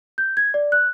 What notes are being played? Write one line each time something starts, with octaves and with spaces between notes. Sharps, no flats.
G6
G#6
D5
F#6